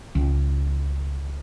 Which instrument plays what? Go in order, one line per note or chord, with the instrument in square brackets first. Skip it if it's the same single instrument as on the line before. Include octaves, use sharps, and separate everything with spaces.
[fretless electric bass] C#2